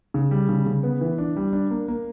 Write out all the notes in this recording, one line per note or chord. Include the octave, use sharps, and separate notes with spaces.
C#3
G3
C#3
C#3
B3
E3
D4
G3
D4
A#3
A#3